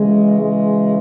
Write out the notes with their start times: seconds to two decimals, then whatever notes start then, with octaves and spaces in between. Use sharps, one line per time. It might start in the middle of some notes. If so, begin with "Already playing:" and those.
Already playing: F#2 C#3 E3 G#3
0.40 G#3